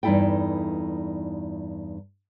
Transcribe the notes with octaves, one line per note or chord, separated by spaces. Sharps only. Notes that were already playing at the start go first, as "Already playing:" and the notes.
E2 G2 D#4 E4 A4 G5